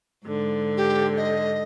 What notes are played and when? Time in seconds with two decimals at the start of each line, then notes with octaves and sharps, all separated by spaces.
0.24 G#2 D3
0.77 G4
1.17 D#5